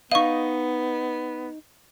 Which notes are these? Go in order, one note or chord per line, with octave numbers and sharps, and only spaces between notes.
B3 D#4 D#5 F5 C#6